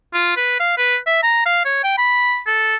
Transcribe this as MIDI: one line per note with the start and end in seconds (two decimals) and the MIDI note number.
0.13 0.36 65
0.37 0.55 71
0.60 0.75 77
0.78 0.98 71
1.07 1.21 76
1.23 1.43 82
1.46 1.61 77
1.65 1.79 73
1.84 1.97 79
1.98 2.40 83
2.47 2.76 69